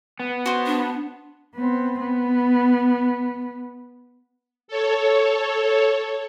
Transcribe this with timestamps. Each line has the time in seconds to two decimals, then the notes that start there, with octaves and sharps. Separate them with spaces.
0.20 B3
0.46 F#4 C5
0.66 D4
1.55 B3 C4
2.00 B3
4.68 A4 C#5